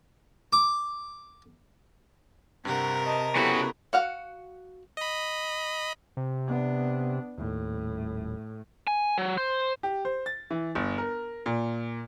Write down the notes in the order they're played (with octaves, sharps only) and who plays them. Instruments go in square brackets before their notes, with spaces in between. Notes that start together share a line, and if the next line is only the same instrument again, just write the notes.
[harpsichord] D6
[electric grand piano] G2 [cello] C3 A#4 [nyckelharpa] G4 F#5
[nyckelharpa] D#5 A5
[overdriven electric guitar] C#3 F#4 [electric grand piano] B3 E4 G4 [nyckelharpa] A4 B5
[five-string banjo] F#4 F5 F#5
[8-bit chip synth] D#5 B5
[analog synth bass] C3
[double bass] B3 D4
[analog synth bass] D#1 [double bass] A2
[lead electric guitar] G#5
F#3
C5
[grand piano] G4
C5
A6
E3
G1
A#4
A#2